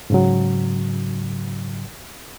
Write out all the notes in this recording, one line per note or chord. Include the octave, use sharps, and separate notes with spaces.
G#2 C#3 F#3